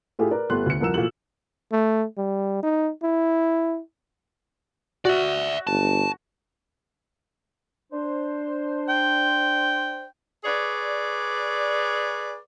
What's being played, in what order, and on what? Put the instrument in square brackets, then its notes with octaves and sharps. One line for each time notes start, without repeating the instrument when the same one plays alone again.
[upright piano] A2 A3 F4 G4 G#4
A#4 B4 D5
G1 A3 B3 G4 C6 F#6
D2 C#7
C2 F2 A#4 E6 E7
A#2 E3 A3 F#4 F#7
[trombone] A3
G3
D#4
E4
[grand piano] F#4 [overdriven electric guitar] D5 E5
[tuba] G1 [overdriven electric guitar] A5
[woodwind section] D4 C5
[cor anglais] G5
[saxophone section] G#4 B4 C#5 D5